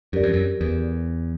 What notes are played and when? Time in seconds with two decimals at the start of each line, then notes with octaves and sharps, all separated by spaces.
0.13 F#2 G4 A#4 D5
0.23 F2
0.33 F#2
0.61 E2